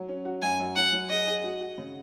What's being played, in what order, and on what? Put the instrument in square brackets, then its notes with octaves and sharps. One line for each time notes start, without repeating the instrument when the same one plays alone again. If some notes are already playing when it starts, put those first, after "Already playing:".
Already playing: [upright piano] F#3
C#4
F#4
[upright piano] F#2 [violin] G#5
[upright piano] F#2
[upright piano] F#3 [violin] F#5
[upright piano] F#3
[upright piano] G#4 [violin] D#5
[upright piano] G#4
F#4
F#4
C#3